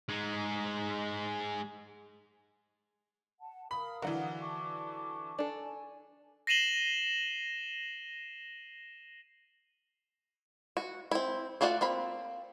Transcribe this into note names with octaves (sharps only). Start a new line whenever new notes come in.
G#3 D#4
F#5 A5
A#4 F5 B5 D#6
D3 E3 F#3 F#5
A5 C#6 D6
D4 A4 G#5
A#6 C7 D#7 E7 F#7 G7
F#4
C4 E4
A3 F4 F#4 D5 F#5
A#3 C4 B5